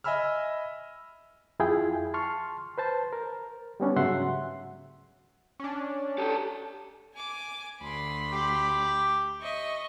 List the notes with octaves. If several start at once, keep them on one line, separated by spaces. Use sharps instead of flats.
D#5 E5 G#5 B5 E6 F6
F2 E4 F4 G#4 G5
A5 C6 C#6 F6
B4 C5 A5
A#4
G3 B3 C#4 D4
G#2 C#3 F#3 E5 F#5 C6
C#4 D4
G4 A4
G#5 D6
D2 B5 C6
G4 G5 D6
D#5 E5 C#6